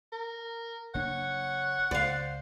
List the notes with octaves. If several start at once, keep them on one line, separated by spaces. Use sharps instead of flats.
A#4
F#1 A#3 D4 C#5 F#5
C#2 C5 D5 F5